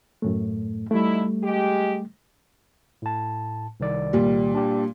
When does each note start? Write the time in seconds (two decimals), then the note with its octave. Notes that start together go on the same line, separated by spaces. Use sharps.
0.22 F#2 A2 A3
0.91 D3 G3 A3 D#4 E4
1.44 G#3 G4
3.02 A2 A5
3.80 C2 D#3 D5
4.13 A#2 G3
4.55 D4 G4